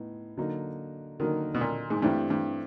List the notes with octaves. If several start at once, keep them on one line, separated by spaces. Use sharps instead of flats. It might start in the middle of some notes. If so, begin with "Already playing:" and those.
Already playing: A2 B3 D#4
D3 F#3 A#3 D#4
D3 D#3 F#3 A#3 D#4
B2
A#2
G#2
G2 E3 A3 C4 E4 G4
G2